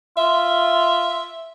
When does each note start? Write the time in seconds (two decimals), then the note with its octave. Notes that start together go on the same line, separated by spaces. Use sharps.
0.18 F4 E5